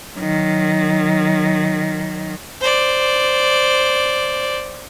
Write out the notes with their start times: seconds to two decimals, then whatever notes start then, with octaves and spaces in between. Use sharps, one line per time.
0.17 D#3 F#3
2.61 C5 D5